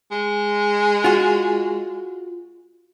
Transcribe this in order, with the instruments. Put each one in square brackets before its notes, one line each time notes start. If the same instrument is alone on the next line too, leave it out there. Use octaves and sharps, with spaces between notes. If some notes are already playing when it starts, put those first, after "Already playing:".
[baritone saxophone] G#3
[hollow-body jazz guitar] F4 F#4